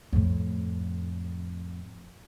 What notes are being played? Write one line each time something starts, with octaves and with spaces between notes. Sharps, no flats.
F2 A2